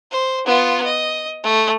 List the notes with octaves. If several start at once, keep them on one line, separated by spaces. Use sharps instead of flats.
C5
B3 F4
D#5
A3